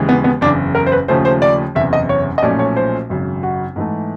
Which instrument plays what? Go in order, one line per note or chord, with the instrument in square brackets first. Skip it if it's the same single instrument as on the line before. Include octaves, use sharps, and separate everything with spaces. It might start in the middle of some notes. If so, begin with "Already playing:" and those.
Already playing: [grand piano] D#2 C#3 E3 G#3
[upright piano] B3
B3
[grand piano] F#1 E2 C#3 [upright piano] D4
[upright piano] A#4
C5
B4
[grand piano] D#2 C#3 F3 A3 C#4 [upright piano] C5
[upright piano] C5
D5
[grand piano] F#1 E2 C3 [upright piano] E5
[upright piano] D#5
C#5
D#5
[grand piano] B1 A#2 F3 A3 C#4 [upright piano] D5
[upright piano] C#5
C5
[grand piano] G#1 F#2 C#3
[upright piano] F#4
[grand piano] G#2 E3 A3